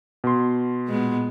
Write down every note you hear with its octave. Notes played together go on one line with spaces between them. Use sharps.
B2 C6
A#2 G#3 B3